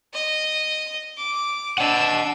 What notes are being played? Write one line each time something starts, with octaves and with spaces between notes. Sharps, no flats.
D#5
D6
D4 D#5 F#5 E6